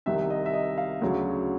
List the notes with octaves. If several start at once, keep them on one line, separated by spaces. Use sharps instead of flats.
C2 C3 D#3 E5
D#5
E5
D#5
F5
D2 C#3 F#3